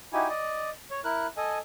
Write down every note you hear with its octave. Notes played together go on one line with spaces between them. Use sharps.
D#4 E4 F#4 G4 G#5
D5 D#5
C#5
E4 A#4 F#6
A4 D#5 G#5